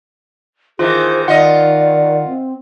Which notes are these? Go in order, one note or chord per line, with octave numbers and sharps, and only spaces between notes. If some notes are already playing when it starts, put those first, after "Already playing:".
D#3 E3 F4 G#4 C5
D#3 F4 D5 D#5 F#5
C4